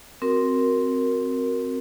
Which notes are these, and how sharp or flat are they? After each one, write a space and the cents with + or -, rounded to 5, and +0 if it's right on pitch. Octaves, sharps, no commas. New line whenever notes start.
C4 +0 F#4 +0 A#4 +0